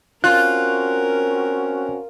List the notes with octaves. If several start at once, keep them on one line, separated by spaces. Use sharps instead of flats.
C4 C#4 F4 F#4 A#4 F#6